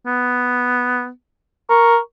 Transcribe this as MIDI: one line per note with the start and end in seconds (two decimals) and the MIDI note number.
0.06 1.09 59
1.70 1.99 70
1.70 1.98 85